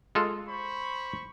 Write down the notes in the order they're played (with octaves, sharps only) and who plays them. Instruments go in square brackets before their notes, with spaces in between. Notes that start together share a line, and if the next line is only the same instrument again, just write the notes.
[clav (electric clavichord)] G#3 F4 A4
[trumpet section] C5 B5 C#6